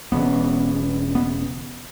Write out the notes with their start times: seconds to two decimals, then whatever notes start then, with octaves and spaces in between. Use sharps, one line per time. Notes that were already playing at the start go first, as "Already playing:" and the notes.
0.12 E1 E2 C#3 B3
1.15 B3